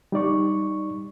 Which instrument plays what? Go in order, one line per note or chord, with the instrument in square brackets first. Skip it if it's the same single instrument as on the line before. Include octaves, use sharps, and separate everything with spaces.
[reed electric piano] G3 D#4 D5 C#6